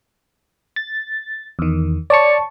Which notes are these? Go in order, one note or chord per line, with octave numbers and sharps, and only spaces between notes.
A6
E2 D#3
C#5 D5 A5 C#6 C#7